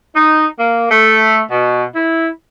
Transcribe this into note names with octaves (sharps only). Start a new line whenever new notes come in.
D#4
A#3
A3
B2
E4